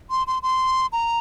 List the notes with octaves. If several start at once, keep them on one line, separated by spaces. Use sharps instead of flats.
C6
C6
C6
A#5